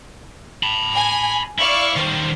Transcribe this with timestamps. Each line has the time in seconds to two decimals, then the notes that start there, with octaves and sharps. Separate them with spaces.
0.63 A5 B5
0.95 G#5
1.59 E4 D5 F5 C#6
1.96 D#3 G3 C5